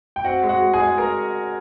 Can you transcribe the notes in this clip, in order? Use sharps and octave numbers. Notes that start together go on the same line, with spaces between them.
G5
C4 F#4 F#5
G#3
F#4 F#5
G#3
G#4 G#5
G#3
G#3 A#4 A#5